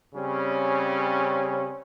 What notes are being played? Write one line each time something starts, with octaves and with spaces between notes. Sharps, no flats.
C#3 G3 C4 C#4